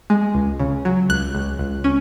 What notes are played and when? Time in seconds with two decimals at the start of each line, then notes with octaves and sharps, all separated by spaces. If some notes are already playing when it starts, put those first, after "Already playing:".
0.10 G#3
0.35 C#2
0.59 C#3
0.85 F#3
1.09 C#2 F#6
1.35 C#2
1.59 C#2
1.84 C#4